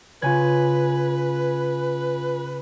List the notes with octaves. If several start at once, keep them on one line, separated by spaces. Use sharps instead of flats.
C#3 F4 B4 G#5 G#6